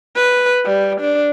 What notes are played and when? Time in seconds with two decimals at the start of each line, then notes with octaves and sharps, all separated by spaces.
0.16 B4
0.65 G3
1.01 D4